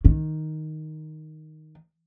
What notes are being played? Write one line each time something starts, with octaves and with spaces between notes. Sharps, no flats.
D#3